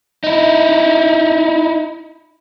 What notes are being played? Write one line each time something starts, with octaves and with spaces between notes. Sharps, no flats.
D#4 E4